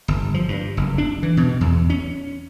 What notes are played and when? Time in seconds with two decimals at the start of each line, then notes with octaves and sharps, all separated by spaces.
0.08 G1
0.34 F3
0.48 G2
0.77 F#1
0.98 D4
1.23 E3
1.37 B2
1.61 E2
1.90 C#4